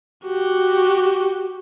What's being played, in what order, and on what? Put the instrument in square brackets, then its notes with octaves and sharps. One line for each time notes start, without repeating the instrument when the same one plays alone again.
[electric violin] F#4 G4